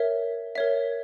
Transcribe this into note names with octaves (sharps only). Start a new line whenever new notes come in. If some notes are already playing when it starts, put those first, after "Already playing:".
Already playing: A#4 C#5 E5
A#4 C#5 E5